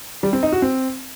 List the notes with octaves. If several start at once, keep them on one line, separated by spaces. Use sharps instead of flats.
G3
C4
D#4
F#4
C4